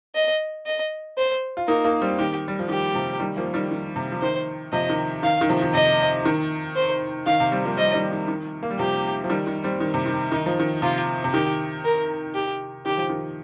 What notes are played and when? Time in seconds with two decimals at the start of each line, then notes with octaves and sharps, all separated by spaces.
0.15 D#5
0.66 D#5
1.18 C5
1.57 F4
1.67 A#3 D#4 A#4
1.84 A#3 D#4
2.02 G3 C4
2.19 D#3 G4
2.48 G3
2.59 F3
2.69 D#3 G4
2.94 C3 F3
3.20 D#3 G3
3.37 F3 A#3
3.54 D#3 G3
3.71 D#3
3.96 C3
4.12 F3
4.22 D#3 C5
4.72 C3 F3 D#5
4.89 D#3
5.23 D#3 F5
5.41 D#3
5.49 C3 F3
5.62 D#3
5.74 C3 D#5
6.26 D#3
6.76 C5
7.26 D#3 F5
7.40 C3
7.52 G3 C4
7.65 F3 A#3
7.77 G3 C4 D#5
7.94 D#3 G3
8.11 D#3
8.28 D#3
8.63 A#3
8.71 G3
8.79 C3 F3 G4
9.24 F3
9.29 D#3 G3
9.47 D#3
9.64 G3 C4
9.80 D#3
9.94 C3
10.06 D#3
10.31 D#3 D#4
10.46 F3
10.60 D#3
10.82 C3 F4
11.24 C3
11.33 D#3 G4
11.85 A#4
12.34 G4
12.86 D#3 G4
12.97 F3
13.09 D#3